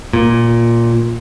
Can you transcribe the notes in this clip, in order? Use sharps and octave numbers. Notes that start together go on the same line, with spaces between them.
A#2